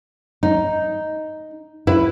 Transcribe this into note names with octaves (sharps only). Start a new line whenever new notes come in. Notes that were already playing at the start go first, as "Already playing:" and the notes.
D#4
E4 B4